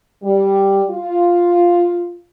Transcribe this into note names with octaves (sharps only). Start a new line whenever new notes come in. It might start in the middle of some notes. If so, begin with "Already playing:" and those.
G3
F4